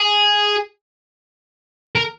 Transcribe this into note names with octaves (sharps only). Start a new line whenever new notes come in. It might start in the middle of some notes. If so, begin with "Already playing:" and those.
Already playing: G#4
A#4